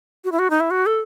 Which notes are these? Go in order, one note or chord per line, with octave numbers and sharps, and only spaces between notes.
F#4
E4
F#4
D#4
E4
F#4
A4